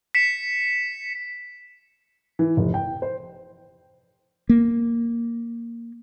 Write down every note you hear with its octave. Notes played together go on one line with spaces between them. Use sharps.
B6 C#7 E7
E3
F1
G5
C5
A#3